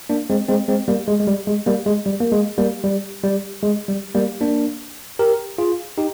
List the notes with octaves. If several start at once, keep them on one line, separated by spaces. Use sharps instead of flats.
A#3 D4
G#3 C4
G#3 C4
G#3 C4
G3 A#3
G#3
G#3
G3
G#3
G3 A#3
G#3
G3
A#3
G#3
G3 A#3
G3
G3
G#3
G3
G3 A#3
A#3 D4
G4 A#4
F4 G#4
D#4 G4